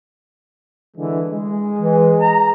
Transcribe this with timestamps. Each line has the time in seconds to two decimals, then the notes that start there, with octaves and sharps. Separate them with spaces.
0.97 D3 E3 G#3
1.32 G#3
1.79 E3
2.22 A#5